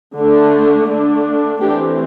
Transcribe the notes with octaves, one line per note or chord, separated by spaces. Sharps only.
D3 A3 D4
D3 A3 D4
E3 A3 C4 D4 G4